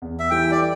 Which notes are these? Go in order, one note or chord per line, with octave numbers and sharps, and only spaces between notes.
E2
E5
E3 G3 E4 A4 G5
D5